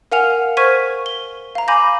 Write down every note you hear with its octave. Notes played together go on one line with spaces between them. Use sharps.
A#4 F5 F#5 G#5 F6 F7
C5 C#6 F6 G#6 B6 D#7
G7
F5 A#5
G#5 B5 D6 G6 A#6